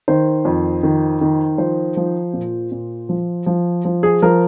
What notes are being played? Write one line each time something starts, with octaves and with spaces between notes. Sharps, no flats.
D#3 C5
F2
D#3
D#3
F3 C5
F3
A#2
A#2
F3
F3
F3
G#4
F3 A#4